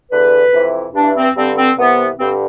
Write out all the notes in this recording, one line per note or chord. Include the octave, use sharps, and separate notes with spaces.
E2 D3 B4
F2 C3 E3
G2 E3 D4
C4
G2 D3 C4
C4
C2 C3 E3 B3
G2 D3 C4